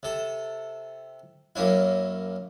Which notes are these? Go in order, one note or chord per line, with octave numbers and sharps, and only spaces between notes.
C3 A4
F#2 A#3 C#4 E4